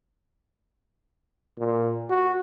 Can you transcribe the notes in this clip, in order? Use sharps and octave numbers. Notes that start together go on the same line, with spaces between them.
A#2
F#4